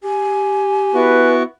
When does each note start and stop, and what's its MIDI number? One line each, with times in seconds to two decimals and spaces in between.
0.04 1.38 67
0.04 1.34 80
0.94 1.43 59
0.94 1.43 64
0.94 1.43 66
0.94 1.33 71